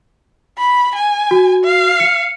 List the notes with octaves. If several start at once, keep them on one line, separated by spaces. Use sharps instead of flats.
B5
G#5
F#4
F5
C#7